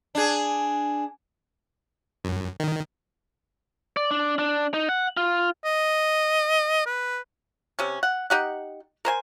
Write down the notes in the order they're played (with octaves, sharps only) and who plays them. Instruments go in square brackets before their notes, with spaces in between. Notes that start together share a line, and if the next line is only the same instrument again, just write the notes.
[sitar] D4 G#4
[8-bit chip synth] F#2
D#3
[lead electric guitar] D5
D4
D4
D#4
F#5
F4
[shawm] D#5
B4
[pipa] C3 C#4
F#5
D#4 G4 F#5
A#4 C5 G#5